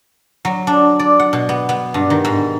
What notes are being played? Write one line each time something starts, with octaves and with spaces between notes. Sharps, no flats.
F#3
D4
D5
F#5
B2
B3
B3
G2
D#3
G#2